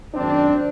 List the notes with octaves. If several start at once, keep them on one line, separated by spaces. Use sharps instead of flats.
G#1 F#2 D#3 C4 D4